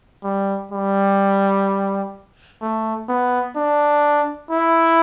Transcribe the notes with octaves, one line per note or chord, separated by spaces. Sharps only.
G3
G3
A3
B3
D4
E4